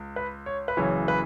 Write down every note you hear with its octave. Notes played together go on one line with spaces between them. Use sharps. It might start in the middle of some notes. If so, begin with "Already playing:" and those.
Already playing: C#2
B4
C#5
B4
F#1 F#2 C#3 E3 C#5
B4